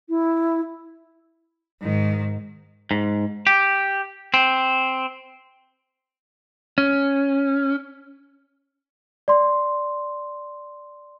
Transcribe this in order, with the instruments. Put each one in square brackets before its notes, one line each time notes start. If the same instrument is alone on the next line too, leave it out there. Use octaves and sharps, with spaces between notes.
[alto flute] E4
[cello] G#2 D#3
[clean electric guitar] G#2
G4
C4
[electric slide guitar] C#4
[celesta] D5 C6